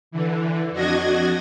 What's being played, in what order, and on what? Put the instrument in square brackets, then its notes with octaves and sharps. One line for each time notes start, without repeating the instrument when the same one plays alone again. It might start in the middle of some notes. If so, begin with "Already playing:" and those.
[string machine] D3 E3
F2 D4 F#4 D#5 G#6 A#6